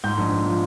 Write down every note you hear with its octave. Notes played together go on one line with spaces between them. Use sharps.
G#2 G6
A#1
A#1
F3